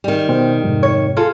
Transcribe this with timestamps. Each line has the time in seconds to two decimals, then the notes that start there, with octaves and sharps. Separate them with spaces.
0.04 D#3 G3
0.29 B2 C5 G5
0.63 F2 G#2 C3
0.83 C#5
1.17 F4 G#4 A4